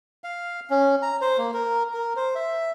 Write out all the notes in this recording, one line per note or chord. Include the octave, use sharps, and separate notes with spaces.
F5
C#4
A#5
C5
A#3
A#4
A#4
C5
E5